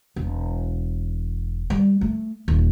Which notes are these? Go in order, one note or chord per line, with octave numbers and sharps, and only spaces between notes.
E1
G3
A3
D#1